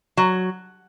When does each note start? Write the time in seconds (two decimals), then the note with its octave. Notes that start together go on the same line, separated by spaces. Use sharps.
0.17 F#3